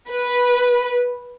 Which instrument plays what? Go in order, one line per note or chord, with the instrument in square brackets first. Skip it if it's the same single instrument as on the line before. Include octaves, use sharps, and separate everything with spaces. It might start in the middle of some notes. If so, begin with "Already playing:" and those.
[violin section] B4